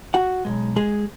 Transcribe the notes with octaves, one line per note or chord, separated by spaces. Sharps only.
F#4 F#5
B1 A#2 G#3
G#3 G#4